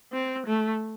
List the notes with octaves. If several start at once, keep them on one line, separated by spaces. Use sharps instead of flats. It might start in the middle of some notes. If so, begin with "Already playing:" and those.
C4
A3